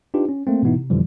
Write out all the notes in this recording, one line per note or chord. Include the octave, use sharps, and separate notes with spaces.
D4 D#4 F4 G4 B4
C#4
A3 A#3 C4
G#2 B2 E3 B3 D#4 E4
C3
F2 B2 D3 E3 F3 G3